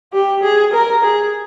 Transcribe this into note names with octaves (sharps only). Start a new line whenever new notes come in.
G4
G#4
A#4
G#4